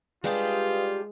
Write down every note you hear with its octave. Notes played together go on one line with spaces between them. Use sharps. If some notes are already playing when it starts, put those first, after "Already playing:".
G3 G#3 D4 F4 G4 B4 F5 D#6